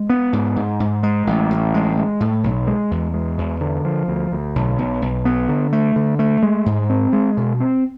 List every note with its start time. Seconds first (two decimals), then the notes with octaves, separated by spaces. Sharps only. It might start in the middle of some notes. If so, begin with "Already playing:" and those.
Already playing: G#3
0.10 B3
0.33 G#2
0.56 G#2
0.80 G#2
1.03 G#3
1.27 A1
1.51 A1
1.74 G#3
1.97 G#3
2.20 A2
2.44 B1
2.67 G#3
2.91 E2
3.14 G#3
3.38 E2
3.61 D3
3.85 F3
4.08 D2
4.32 D2
4.56 B1
4.79 B1
5.02 B1
5.25 B3
5.49 D3
5.73 A3
5.96 D3
6.19 A3
6.43 G#3
6.66 G#2
6.90 C4
7.13 G#3
7.37 B2
7.60 C4